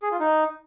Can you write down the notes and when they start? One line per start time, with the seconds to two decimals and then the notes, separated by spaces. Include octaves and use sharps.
0.03 G#4
0.11 F4
0.20 D#4